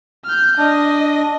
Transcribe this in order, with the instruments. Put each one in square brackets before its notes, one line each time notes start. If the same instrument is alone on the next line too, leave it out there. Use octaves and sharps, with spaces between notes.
[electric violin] F6 G6
[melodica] D4 [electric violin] D#5